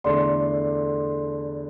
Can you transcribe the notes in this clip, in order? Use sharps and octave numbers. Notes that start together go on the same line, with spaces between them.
E2 D3 A3 D4 C6